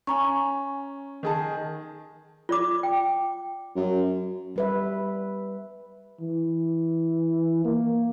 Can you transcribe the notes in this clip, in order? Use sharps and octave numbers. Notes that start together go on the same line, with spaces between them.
C#4 G#5 A#5 C#6
D#3 G#4 A5
F4 D5 D6
G5
F#2
G3 B4 E5
E3
A#3